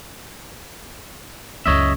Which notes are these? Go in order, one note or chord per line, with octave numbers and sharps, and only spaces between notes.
F#1 C#2 C#5 D#5 E5